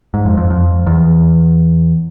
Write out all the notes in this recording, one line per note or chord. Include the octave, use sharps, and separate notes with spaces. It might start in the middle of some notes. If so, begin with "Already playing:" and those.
G#2
F2
F2
F2
E2